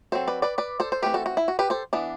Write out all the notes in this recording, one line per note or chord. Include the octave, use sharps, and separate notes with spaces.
F#3 C4 A4 C5
B4 D5
B4 D5
B4 D5
A4 C5
C5
E3 A3 C4 G4 B4
F#4 A4
F#4
E4
F#4
G4 B4
A4 C5
E3 B3 D4